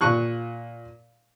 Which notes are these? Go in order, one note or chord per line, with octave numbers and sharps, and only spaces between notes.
A#2 C#6 F#6